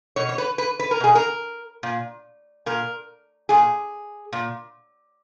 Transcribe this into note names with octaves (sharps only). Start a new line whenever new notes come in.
B2 C#5
C#5
B4
B4
B4
A#4
B2 G#4
A#4
A#2
A#2 A#4
A#2 G#4
A#2